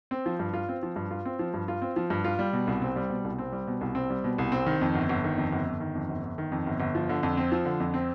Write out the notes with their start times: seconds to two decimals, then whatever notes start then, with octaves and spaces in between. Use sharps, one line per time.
0.11 C4
0.26 F3
0.39 G2
0.54 F4
0.69 C4
0.83 F3
0.96 G2
1.11 F4
1.25 C4
1.39 F3
1.54 G2
1.68 F4
1.82 C4
1.96 F3
2.10 G2
2.24 F4
2.39 G3
2.53 B2
2.67 C2
2.82 C4
2.96 G3
3.09 B2
3.24 C2
3.39 C4
3.52 G3
3.67 B2
3.81 C2
3.95 C4
4.10 G3
4.24 B2
4.38 C2
4.52 C4
4.66 D#3
4.81 F2
4.95 G1
5.09 G1
5.24 D#3
5.38 F2
5.52 G1
5.66 G1
5.80 D#3
5.95 F2
6.09 G1
6.23 G1
6.38 D#3
6.52 F2
6.67 G1
6.80 G1
6.95 F3
7.09 D3
7.23 F2
7.37 C4
7.52 F3
7.65 D3
7.80 F2
7.94 C4